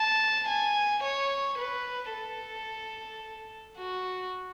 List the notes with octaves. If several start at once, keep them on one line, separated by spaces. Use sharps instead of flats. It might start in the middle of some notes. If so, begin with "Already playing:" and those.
Already playing: A5
G#5
C#5
B4
A4
F#4